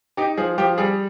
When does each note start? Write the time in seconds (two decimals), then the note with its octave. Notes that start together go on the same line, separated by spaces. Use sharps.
0.17 D#4 G4
0.37 F3 G#4
0.58 F3 G4
0.78 G3 G#4